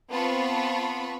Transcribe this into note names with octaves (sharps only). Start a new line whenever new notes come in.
B3 C4 F4 A5 B5 C#6